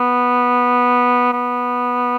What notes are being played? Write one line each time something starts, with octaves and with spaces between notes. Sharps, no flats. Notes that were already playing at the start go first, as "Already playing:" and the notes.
Already playing: B3
B3